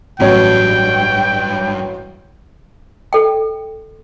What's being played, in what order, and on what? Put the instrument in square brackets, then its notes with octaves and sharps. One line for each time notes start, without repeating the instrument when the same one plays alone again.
[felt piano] A1 F#3 C#5 [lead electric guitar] G2 [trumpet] G5
[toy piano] A4 D#5 G5